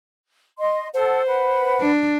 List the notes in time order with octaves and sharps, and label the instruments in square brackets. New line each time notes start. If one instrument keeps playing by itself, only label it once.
[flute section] D#5 C6
[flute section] A4 F#5 [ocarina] C5
[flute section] B4 F#5
[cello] D4